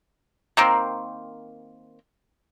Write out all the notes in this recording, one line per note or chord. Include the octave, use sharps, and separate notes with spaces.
D#3 A#3 C4